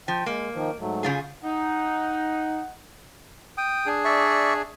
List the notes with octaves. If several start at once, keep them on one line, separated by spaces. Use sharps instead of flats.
F3 G5
G#3 A#3
D#3 F3
G#2 F#3 A3
C#3 F4 G#4
D#4 F#5
G5 D#6
D4 G#4
D5 E5 C#6